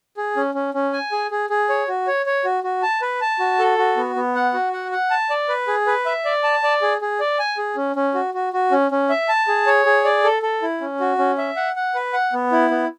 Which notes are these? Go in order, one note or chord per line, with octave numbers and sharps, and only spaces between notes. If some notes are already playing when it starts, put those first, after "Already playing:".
G#4
C#4
C#4
C#4
G#5
G#4
G#4
G#4
C#5
F#4
C#5
C#5
F#4
F#4
A5
B4
A5
F#4
A4
F#4
B3
B3
F#5
F#4
F#5
F#5
A5
D5
B4
G#4
B4
E5
D5
A5
D5
G#4
G#4
D5
G#5
G#4
C#4
C#4
F#4
F#4
F#4
C#4
C#4
E5
A5
G#4
C#5
G#4
D5
A4
A4
E4
C#4
F#4
C#4
E5
F#5
F#5
B4
F#5
B3
E4
B3